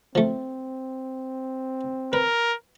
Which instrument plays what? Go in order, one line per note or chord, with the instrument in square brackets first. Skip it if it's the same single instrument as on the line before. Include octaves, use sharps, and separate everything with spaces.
[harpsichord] F3 A3 [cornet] C4
[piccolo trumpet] A#4 [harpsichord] B4